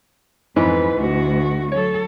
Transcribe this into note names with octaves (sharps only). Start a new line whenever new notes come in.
F2 G#2 E3 B3 B4
D2 F#4
F#3 A4 C#5